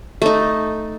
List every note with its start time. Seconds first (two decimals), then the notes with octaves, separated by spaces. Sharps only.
0.22 A3 D#4